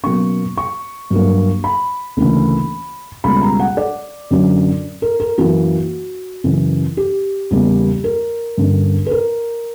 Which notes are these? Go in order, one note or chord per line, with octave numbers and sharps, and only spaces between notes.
B2 F#3 A#3 C#4 C#6
C#6
G2 F#3 A#3
B5
D2 C#3 E3 A#3 C#4
C#2 B2 G3 A#3 C#4 B5
A#5
F#5
D5
F#2 D3 F#3 C#4
A#4
A#4
F#2 E3 A#3 F#4
F#2 C#3 E3
G4
E2 C#3 G3 A#3
A#4
G2 D3 A#3 C#4
B4
A#4